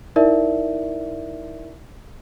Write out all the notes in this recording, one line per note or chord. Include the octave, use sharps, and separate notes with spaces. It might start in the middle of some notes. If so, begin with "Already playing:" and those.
D#4 E4 A#4 D5 E5